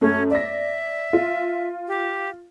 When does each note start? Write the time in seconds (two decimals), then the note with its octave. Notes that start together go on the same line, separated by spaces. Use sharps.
0.01 F#2 A3 C#4
0.31 D5 E5 A#6
1.13 F4
1.88 G4